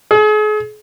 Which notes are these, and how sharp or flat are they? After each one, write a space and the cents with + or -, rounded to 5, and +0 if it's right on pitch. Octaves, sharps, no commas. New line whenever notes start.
G#4 +40